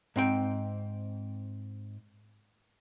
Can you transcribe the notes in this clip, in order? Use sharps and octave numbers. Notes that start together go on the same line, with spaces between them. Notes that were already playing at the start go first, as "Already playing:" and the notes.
G#2 C4 G5